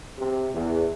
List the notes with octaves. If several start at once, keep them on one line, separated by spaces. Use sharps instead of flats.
C3
E2